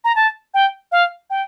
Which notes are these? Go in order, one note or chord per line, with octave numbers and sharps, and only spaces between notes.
A#5
A5
G5
F5
G5